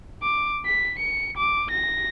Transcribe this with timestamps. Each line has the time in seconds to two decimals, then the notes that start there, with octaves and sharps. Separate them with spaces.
0.23 D6
0.66 B6
0.99 C#7
1.37 D6
1.71 A#6